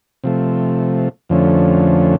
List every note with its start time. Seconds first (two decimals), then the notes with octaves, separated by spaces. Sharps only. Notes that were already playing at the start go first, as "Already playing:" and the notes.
0.24 C3 F3 A3
1.29 F2 D3 F3 A3 C#4